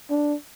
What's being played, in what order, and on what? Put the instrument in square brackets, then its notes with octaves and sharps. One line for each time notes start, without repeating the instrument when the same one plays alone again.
[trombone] D4